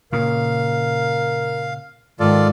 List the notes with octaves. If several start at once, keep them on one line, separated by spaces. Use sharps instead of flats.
A#2 C#3 A#4 F5
G#2 D#3 F4 A4 D5